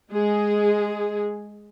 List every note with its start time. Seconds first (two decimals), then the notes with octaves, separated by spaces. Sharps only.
0.11 G#3 G#4